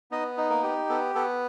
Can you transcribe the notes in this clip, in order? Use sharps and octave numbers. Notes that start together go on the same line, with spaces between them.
B3 D#4 D#5
D#4
A#3 A#4
G4
B3 A4
B3 A4